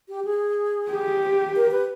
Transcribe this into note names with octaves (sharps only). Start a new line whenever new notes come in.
G4
G#4
G4
A#4
B4